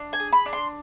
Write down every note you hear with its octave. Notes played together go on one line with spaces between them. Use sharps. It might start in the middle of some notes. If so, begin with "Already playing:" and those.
Already playing: D4
G#5
G#4
B5
D4
C6